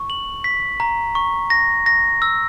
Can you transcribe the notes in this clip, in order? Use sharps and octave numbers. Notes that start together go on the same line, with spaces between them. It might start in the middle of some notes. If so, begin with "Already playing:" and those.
Already playing: C#6
F#7
B6
A#5
C#6
A#6
A#6
E6